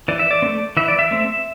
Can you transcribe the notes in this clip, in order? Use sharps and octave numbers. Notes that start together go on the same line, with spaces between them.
E3 D5
E5
D5
C4
A3
E3 E5
D5
E5
A3 C4